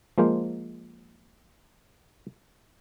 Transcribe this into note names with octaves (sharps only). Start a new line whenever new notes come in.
F3 G#3 A#3 F4 C5